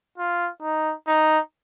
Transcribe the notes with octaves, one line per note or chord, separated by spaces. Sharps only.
F4
D#4
D#4